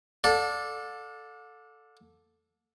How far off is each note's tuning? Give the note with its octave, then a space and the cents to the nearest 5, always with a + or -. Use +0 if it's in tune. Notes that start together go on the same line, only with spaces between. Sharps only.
A4 +0 D5 +0 F#5 -45